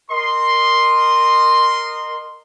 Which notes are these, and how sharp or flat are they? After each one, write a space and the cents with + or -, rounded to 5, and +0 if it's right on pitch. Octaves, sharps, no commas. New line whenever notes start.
A#4 +0 D#5 -20 C6 +0